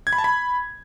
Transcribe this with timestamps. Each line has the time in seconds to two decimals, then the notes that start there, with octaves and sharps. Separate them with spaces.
0.07 G#6
0.13 B5
0.18 A5
0.24 B5